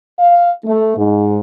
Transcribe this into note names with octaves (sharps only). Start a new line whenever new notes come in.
F5
A3
G#2